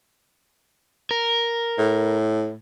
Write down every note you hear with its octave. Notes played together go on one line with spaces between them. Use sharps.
A#4
A2